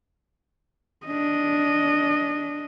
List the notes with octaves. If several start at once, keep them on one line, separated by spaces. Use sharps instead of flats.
D4 D#5